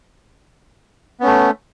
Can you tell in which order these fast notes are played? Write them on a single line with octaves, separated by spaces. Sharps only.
B3 C#4 A3